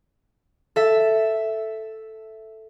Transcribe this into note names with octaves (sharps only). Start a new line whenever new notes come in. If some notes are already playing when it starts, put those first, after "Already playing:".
A4 E5